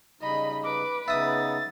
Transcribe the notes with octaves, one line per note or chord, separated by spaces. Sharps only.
C#3 G3 D#4 D#5 B5
B4 D6
C#3 B3 D#4 E5 D#6 A6